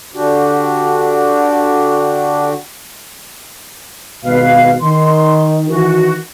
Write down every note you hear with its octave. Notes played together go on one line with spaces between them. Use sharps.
D3 D4 F#4 G4
G#1 B2 B4 F5
D#3 C6
D#3 E3 F#4